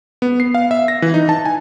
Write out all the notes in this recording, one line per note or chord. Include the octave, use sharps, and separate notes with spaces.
B3
C7
F5
E5
A#6
E3
D#4
A5
G#5